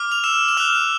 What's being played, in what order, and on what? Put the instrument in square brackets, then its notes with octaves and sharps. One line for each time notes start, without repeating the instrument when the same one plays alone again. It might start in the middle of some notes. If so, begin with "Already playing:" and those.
Already playing: [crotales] D6 F6
F7
E6 E7
E7
D6 F6 F#6 F7